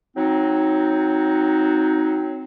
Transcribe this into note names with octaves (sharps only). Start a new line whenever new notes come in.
F#3 C4 D#4